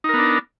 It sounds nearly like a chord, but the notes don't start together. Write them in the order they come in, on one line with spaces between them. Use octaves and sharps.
D#4 A#4 B3 D4